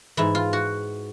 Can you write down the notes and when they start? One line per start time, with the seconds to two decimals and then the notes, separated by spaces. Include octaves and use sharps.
0.17 G#2 E3 E4
0.35 F4
0.53 F#4